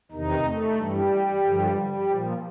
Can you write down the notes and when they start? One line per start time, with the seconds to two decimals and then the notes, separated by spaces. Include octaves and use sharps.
0.11 E2 C3 D#3 D#4
0.44 A3
0.77 G2 E3 G3
1.44 G2 D3 F3
1.77 G3
2.10 A#2 F3